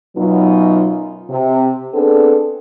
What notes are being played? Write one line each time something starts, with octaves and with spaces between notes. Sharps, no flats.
F#2 B2 F#3 B3 D#4 F4
C3
B3 C4 D4 G#4 A4